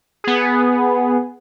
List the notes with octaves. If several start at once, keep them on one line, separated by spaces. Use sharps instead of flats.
B3 G#4